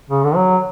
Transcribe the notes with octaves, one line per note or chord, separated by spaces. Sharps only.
C#3
D3
F#3